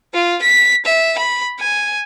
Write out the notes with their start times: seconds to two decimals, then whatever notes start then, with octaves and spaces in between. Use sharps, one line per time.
0.14 F4
0.42 B6
0.85 E5
1.18 B5
1.59 G#5